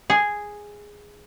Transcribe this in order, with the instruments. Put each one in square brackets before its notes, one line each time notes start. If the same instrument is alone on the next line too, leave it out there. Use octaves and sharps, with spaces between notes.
[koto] G#4